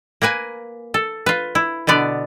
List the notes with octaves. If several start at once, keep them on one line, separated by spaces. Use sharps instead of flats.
A#3 A#4 B4 G#5
A4
F4 B4
E4
B2 D3 B3 D5